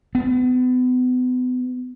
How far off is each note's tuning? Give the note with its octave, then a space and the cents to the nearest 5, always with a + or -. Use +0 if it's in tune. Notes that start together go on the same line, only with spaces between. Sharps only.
B3 +35